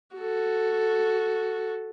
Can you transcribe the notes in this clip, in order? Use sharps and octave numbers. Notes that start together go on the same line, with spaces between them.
F#4 A4